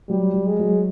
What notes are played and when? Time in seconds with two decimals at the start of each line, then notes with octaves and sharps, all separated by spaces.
0.09 F#3 G3
0.34 F#3
0.47 G#3
0.59 F#3